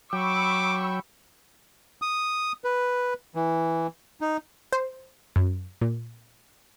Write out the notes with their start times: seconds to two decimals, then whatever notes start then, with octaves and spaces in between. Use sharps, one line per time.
0.13 F#3 G5 B5 C#6 D6 E6
2.02 D#6
2.64 B4
3.35 E3
4.21 D#4
4.73 C5
5.36 F#2
5.81 A#2